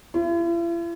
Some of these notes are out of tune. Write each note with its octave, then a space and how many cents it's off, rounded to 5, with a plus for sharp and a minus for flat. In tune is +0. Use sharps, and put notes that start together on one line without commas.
E4 +45